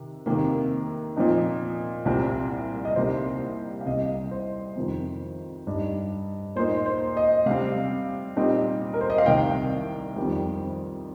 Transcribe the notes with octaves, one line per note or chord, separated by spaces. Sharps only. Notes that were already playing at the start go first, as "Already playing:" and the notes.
Already playing: C3 D#3
C3 D#3 A#3
A#2 F3 C4 D#4
C2 A#2 G3 C4
D#5
C2 C3 G3 A#3 D#4 C5
F5
C2 C3 G3 D#5
C5
F2 C3 D#3
G2 G3 D#4
A#2 A#3 D#4 C5
C5
D#5
C3 G3 C4 F5
A#2 G3 C4 D#4
A#4
C5
D#5
F5
C2 C3 D#3 G5
F2 D#3 G3